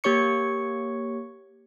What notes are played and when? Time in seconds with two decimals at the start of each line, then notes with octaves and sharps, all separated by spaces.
0.04 A#3 G4 C#5 C#6 C#7